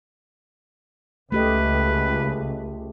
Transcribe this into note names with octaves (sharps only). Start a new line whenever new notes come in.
C#2 A3 G4 B4 D#5